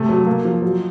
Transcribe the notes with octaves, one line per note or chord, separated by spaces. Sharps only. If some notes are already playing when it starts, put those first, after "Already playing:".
Already playing: C3 A3
F#3
A#3
F3
F#3